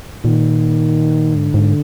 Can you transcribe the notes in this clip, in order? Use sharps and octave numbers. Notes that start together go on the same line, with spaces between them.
A#2 D#3
G#2 D3
G#2